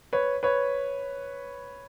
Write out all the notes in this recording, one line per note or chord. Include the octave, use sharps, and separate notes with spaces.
B4 C#5
B4 C#5